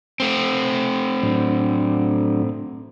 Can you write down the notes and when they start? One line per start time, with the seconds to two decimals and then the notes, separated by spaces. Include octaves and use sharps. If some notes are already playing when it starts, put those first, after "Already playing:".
0.20 A3 C4
1.23 A2 F#3 D4